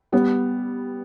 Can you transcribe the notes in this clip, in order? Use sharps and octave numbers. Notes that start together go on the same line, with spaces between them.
G3 B3